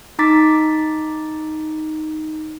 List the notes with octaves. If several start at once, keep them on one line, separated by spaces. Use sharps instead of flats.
D#4 A#5 D6 A6 B6